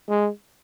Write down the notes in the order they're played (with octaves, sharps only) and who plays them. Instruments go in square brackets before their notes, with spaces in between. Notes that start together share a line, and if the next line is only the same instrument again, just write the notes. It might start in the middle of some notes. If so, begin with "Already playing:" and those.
[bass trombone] G#3